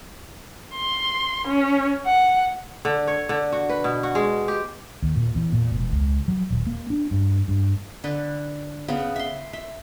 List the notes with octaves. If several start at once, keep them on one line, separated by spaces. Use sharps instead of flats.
C6
C#4
F#5
D3
C#5
D3
F#4
B4
B2
F#4
G#3
G4
D#2
A#2
E2
A#2
E1
C#2
F#3
D#1
A#3
D4
G2
G2
D3 B4
C#3 B3
E5 C6
E5